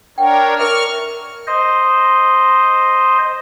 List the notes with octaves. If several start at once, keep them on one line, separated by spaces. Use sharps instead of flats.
D4 A#4 C#5 F#5 G5
A#4 E5 A#5 C#6 F6
C5 D#5